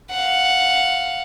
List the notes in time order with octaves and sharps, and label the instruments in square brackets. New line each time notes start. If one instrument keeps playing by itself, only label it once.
[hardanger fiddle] F5 F#5